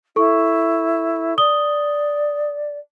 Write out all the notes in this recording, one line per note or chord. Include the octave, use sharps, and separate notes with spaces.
E4 A4 C#6
D5 D#6 G7